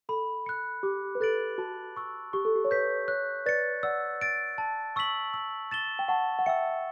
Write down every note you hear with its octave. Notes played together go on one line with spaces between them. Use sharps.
A4 B5
F#6 C#7
G4 D6
B4
A4 F#6 A6 D7 F#7
F#4 A5
C#6 E6
G4 C#6
A4
G4
C#5
B4 G6 B6
C#5 F#6
B4 D5 A6 C#7
D5 F#5 E6
A6 D7
A5
C#6 E6 B6 F#7
E6
A6 E7 G7
G5
F#5 A5 C#6
F#5
E5 G5 E6 A6 C#7